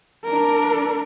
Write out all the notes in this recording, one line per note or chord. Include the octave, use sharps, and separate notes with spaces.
D4 A#4